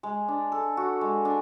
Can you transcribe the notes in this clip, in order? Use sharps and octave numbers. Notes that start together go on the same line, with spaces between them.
G#3
D4
A4
F#4
G#3
D4